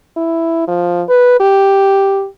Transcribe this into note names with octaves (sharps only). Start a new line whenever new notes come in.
E4
F3
B4
G4